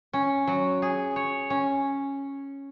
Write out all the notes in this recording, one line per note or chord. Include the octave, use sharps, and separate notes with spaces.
C#4
F#3
G#4
C#5
C#4